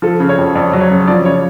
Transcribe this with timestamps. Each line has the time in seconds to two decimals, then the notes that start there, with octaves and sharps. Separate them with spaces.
0.02 F3 A4
0.20 C#3
0.29 C#5
0.38 F2
0.55 F2 D5
0.73 F#3
0.81 C#5
0.90 C#3
1.07 F3 D5
1.25 C#3 C#5